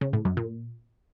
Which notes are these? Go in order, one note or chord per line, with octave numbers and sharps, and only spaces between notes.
C#3
A2
F#2
A#2